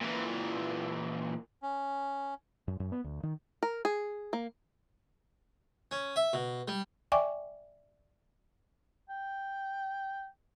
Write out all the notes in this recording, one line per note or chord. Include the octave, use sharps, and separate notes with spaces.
A#2 E3
C#4
F#2
F#2
B3
D2
D#3
A#4
G#4
A#3
C#4
E5
B2
G3
D5 E5 G5 G#5 C#6 D6
G5